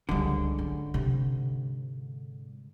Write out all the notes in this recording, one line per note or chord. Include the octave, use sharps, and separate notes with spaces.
C#2 G#2 D3 G3
C#4
C3